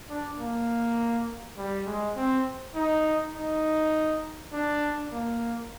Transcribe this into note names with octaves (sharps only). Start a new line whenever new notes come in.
D4
A#3
G3
G#3
C4
D#4
D#4
D4
A#3